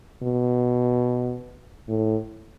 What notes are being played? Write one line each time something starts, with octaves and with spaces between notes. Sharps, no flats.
B2
A2